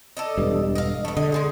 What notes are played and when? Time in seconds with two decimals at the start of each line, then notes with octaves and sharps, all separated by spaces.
0.17 A4 D5 D#5
0.38 E1 G2
0.75 D#5 F5
1.05 A3 B3
1.17 D3 D#5
1.32 G#3 D#4 G#4